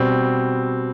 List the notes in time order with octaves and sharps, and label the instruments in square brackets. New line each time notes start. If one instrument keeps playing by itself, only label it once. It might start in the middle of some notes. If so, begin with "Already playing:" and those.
Already playing: [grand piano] B2 G3 C4